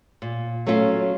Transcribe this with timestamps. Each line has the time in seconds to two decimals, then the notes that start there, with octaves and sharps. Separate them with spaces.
0.22 A#2
0.66 F#3 A3 C#4 F4